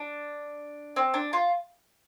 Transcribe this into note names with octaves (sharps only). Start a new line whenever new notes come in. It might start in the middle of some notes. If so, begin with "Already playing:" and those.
Already playing: D4
C4
D4
F4